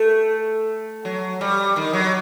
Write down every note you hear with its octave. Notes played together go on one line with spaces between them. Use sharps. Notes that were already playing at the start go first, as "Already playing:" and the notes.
Already playing: A3
F#3
G3
D#3
F#3